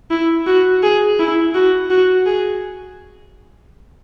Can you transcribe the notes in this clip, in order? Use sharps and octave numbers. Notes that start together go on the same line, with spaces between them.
E4
F#4
G#4
E4
F#4
F#4
G#4